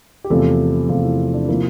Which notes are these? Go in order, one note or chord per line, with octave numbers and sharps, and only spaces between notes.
G4
E2 C3 F3 A3 A4
E2 C3 F3 A3 F4
E4
D4
C3 F3 A#3 E4